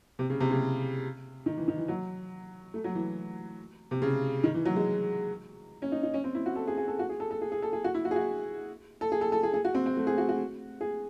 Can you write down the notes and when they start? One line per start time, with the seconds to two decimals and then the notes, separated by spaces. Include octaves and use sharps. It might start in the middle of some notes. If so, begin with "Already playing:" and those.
0.19 C3
0.30 C#3
0.40 C3
0.51 C#3
1.46 D#3
1.58 E3
1.68 D#3
1.78 E3
1.88 F#3
2.74 A3
2.84 F#3
2.95 E3
3.91 C3
4.02 C#3
4.44 D#3
4.54 E3
4.65 F#3
4.76 G#3
5.82 C#4
5.92 D#4
6.03 D#4
6.14 C#4
6.24 C4
6.35 E4
6.46 F#4
6.56 A4
6.67 G#4
6.78 G#4
6.88 A4
6.99 F#4
7.09 G#4
7.20 A4
7.31 A4
7.41 G#4
7.52 G#4
7.62 A4
7.73 G#4
7.84 F#4
7.94 E4
8.05 F#4
8.11 G#4
8.16 F#4
9.01 A4
9.12 G#4
9.21 A4
9.32 A4
9.43 G#4
9.54 G#4
9.65 F#4
9.74 C4
9.86 C4
9.97 A3
10.07 G#4
10.18 F#4
10.29 F#4
10.81 G#4